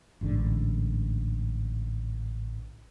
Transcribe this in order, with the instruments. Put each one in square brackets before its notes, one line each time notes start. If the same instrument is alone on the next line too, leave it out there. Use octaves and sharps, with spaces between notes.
[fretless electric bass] A1 G#2 D3